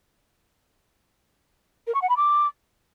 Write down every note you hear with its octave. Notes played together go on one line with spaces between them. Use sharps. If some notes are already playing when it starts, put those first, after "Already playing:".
A#4
C#6
F#5
B5
D6